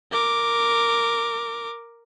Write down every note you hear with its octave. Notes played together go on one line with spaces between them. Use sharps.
A#4 D6